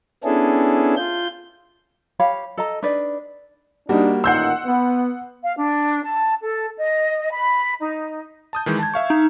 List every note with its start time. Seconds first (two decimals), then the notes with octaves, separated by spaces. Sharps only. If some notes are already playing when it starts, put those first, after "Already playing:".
0.24 B3 C#4 D4 E4 G#4 A4
0.96 F4 G6
2.19 G4 C#5 F5 B5
2.57 A4 D#5 A#5
2.83 D4 D#4 B4 D5
3.89 G3 A#3 D4 D#4 F#4
4.24 A1 A#2 D#3 F#5 C6 E6 G6 C7
4.66 B3
5.43 F5
5.56 D4
6.04 A5
6.42 A4
6.77 D#5
7.31 B5
7.80 D#4
8.53 A5 D#6 G6
8.66 D#3 E3 G#3
8.79 A5 G#6
8.94 E5 F5 C#6
9.10 D#4